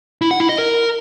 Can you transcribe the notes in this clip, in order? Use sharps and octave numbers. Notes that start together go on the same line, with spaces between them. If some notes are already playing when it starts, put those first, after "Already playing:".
E4
F#5
E4
D#5
A#4